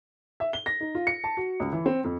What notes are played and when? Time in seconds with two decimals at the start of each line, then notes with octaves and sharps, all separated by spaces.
0.40 E5
0.53 G7
0.66 A#6
0.81 D#4
0.95 F4
1.07 C#7
1.24 A5
1.37 F#4
1.60 C#2
1.73 E3
1.86 C4
2.04 F2